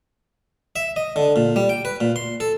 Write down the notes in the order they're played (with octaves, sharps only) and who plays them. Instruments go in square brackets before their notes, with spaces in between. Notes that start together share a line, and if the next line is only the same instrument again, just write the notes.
[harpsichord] E5
D#5
D3
A#2
G3
G5
B4
A#2
C6
A4